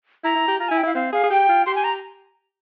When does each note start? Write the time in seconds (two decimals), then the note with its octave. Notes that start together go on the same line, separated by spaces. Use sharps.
0.24 E4 A#5
0.35 E4
0.48 G4
0.60 F4 A#5
0.69 E4 G#5
0.77 G5
0.83 E4 F5
0.95 C4 F5
1.13 G#4 F5
1.24 G#4
1.31 G4 G5
1.49 F4
1.66 G4 C6
1.75 G#5
1.84 A#5